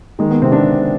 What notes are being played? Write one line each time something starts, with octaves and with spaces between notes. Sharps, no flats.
D#3 G#3
B3
C3 C4
D4
C3